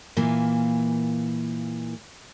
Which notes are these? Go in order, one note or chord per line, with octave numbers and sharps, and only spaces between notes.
A#2 E3 A#3